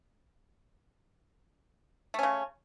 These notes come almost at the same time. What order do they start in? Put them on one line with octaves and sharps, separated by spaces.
A3 C#4 C#3